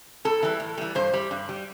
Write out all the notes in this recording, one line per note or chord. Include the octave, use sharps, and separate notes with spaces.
A2 A4
E3 G3
A2
E3 G3
G2 C5
G3
G2
G3